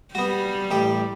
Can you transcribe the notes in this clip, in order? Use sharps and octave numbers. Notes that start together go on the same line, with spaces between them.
G3 B3 F#4
A1 G4